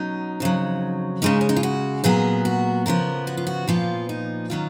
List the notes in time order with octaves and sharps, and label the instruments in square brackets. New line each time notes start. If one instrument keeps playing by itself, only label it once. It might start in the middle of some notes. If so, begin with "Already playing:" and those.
Already playing: [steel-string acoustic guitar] B2 F#3 C#4 D#4
F2 C#3 F#3
C#3 G#3 C#4 D#4
C#4
D#4
F4
F#4
A#2 F#3 B3 G#4
F#4
C#3 F3 B3 A#4
F#4
F4
F#4
A#2 F3 B3 F4
D#4
D#3 F#3 C#4 F4